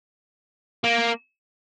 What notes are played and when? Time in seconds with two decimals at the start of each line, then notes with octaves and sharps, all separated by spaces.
0.84 A#3